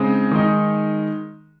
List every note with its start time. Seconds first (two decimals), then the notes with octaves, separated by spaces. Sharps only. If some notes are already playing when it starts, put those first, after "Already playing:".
Already playing: C#3 G#3 C4 D#4
0.31 D#3 G#3 D#4